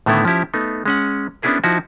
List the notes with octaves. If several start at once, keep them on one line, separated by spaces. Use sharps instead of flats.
A2 D3 D#3 A3 B3 E4
F3 C#4 E4 G4
A3 B3 D#4
G#3 C#4 F#5
B3 C#4 D4 E4 G#4 A#4
F3 D#4 E4 F#4